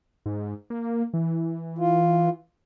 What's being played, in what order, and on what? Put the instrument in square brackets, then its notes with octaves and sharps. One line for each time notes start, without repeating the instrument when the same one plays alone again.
[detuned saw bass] G#2
A#3
E3
[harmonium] F4